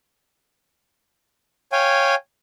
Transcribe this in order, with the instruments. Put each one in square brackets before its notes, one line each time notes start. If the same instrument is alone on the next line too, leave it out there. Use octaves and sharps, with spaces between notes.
[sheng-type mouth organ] C#5 F5 G5 G#5